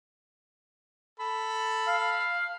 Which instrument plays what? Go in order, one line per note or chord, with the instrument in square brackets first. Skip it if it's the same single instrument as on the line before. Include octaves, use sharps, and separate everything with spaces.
[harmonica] A4 B5
[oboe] F5